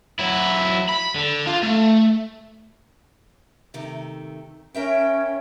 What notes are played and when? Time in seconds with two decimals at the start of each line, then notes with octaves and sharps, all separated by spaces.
0.19 F#3 E4
0.89 B5
1.15 D3
1.47 F4
1.63 A3
3.74 C3 D#3 A3
4.74 C#4 A#4 E5 G5